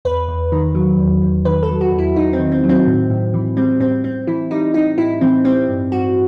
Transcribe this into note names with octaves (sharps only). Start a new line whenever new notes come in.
E2 B4
E2
D#3
F#3
E2
E2
D#3 B4
A4
F#3
F#4
E2
E4
E2 D#4
C4
D#3
C4
F#3
C4
A2
A2
E3
G3 C4
A2 C4
A2 C4
E3 E4
G3 D#4
A2 D#4
A2 E4
E3 C4
G3 C4
G2
G2 F#4